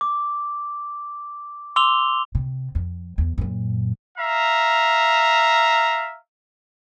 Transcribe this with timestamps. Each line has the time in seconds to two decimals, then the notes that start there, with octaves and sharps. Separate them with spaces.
0.01 D6
1.76 C6 D6 E6 F7 G7
2.35 C3
2.75 F2
3.18 E2
3.38 F#2 A#2
4.18 E5 F5 A#5